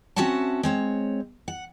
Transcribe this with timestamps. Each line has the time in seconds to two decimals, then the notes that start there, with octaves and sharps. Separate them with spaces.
0.16 C4 C#4 F#4 E5 F#5 A5
0.63 G#3 C4 C#5
1.48 F#5